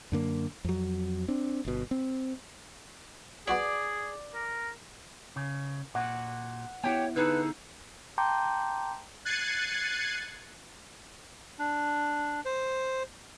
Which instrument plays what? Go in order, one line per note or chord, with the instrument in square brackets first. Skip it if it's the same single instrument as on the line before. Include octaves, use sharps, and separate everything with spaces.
[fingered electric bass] F#2 D3 A#3
F2 F#3
C4 D4
G1 B2
C4
[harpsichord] B3 F#4 E5 [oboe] G#4 [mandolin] D5
[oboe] A#4
[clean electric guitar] C#3
[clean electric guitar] A#2 F#4 [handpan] F#5
[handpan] B3 E4 [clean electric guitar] F#4 G4 G5 [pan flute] C#5
[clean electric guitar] D3 G#4 A4 [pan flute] D#4 [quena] B4
[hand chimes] G5 A5 A#5 C6 D6 G6
[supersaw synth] F#6 G#6 A6 C7 C#7 D#7
[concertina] D4
C5